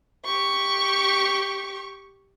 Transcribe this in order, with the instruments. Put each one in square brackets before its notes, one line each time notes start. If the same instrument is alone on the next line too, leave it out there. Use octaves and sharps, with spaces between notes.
[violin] G4 C#6